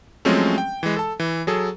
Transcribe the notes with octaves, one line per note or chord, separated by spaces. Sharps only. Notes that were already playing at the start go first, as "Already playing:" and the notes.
F3 F#3 G#3 A3 C4 C#4
G5
E3 G#3
A4 A5
E3
F#3 G#4 A4